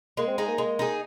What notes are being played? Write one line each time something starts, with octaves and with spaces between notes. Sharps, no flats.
G#3 A#3
C4
G#3 D#4 G#4
A#3
G#3
D#4 G#4